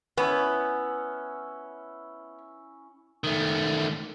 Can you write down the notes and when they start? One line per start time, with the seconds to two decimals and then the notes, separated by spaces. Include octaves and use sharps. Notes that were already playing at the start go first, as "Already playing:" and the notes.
0.17 B3 C#4 E4
3.24 D#3 A3